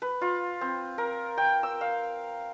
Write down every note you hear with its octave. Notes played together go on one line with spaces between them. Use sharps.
B4
F4
C4
A#4
G5
E6
F5